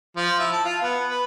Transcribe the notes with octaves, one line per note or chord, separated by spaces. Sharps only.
F3
E4
A5
F4
B3
B4